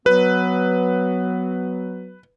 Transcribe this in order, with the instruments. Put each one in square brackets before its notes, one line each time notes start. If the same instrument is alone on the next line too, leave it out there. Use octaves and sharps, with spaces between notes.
[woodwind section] F#3 B3 [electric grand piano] B4